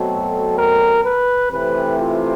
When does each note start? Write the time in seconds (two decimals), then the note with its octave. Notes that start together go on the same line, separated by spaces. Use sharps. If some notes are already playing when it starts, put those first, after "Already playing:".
Already playing: B2 F#3 A3 C4 A4
0.58 A#4
1.05 B4
1.51 C3 E3 A3 C4 B4
1.99 F4